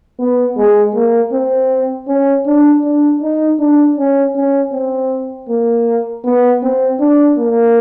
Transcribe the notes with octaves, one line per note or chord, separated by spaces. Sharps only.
B3
G#3
A#3
C4
C#4
D4
D4
D#4
D4
C#4
C#4
C4
A#3
B3
C4
D4
A#3